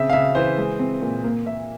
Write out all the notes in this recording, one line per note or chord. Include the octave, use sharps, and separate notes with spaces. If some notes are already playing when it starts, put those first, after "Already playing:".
Already playing: C#3 C4 E5
F5
C#3 E5
E3 C5
G#3
C4
A#2
A#3
A#3 E5